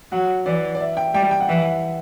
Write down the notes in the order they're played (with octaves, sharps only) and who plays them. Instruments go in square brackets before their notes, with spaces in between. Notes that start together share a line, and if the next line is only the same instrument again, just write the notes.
[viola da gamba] F#3 [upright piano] F#5
[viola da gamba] E3 [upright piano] D5
[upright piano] D5
E5
G5
[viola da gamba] G3 [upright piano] G5
[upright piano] G5
F#5
[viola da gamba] E3 [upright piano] E5
[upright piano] F#5